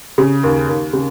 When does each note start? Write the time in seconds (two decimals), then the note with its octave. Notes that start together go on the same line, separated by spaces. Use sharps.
0.18 C#3
0.43 D#2
0.68 D#2
0.93 C#3